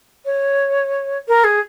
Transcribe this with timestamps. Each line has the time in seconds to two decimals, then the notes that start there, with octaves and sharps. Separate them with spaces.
0.25 C#5
1.28 A#4
1.44 G#4